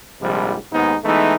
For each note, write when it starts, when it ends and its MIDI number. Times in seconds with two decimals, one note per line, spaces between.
0.21 0.56 34
0.21 0.56 44
0.21 0.56 48
0.21 0.56 53
0.21 0.56 55
0.72 0.96 39
0.72 0.96 44
0.72 0.96 56
0.72 0.96 59
0.72 0.96 63
1.04 1.35 52
1.04 1.35 56
1.04 1.35 57
1.04 1.35 59
1.04 1.35 63